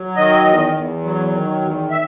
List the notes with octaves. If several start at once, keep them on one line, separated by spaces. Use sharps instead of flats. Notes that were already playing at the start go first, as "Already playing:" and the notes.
Already playing: F#3
D#3 D#5
E2
E2
F#3
D#3
E2
E5